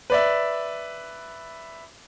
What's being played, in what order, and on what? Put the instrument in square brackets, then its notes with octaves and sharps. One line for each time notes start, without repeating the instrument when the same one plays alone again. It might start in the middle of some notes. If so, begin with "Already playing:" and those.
[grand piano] B4 D5 E5